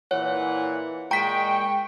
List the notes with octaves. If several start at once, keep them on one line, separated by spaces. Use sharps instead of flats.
A#2 E3 C#5 F#5
A#2 G#3 G5 A#5 C#6 B6